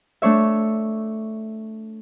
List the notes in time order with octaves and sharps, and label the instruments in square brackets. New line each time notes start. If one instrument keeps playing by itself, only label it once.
[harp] A3 D4 C#5 E5